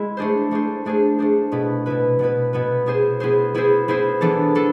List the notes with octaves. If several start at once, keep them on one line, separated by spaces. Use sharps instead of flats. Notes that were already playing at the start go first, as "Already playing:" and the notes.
Already playing: G#3 E4
A3 D4 G#4 C5
A3 D4 G#4 C5
A3 D4 G#4 C5
A3 D4 G#4 C5
B2 B3 E4 B4
B2 B3 E4 B4
B2 B3 E4 B4
B2 B3 E4 B4
B3 E4 G#4 C5
B3 E4 G#4 C5
B3 E4 G#4 C5
B3 E4 G#4 C5
E3 B3 D4 A4
B3 D4 A4